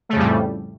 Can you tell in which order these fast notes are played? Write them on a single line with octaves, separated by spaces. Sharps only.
A3 C#3 F2 G3 A2